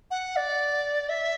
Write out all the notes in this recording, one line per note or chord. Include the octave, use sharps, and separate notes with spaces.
F#5
D5
E5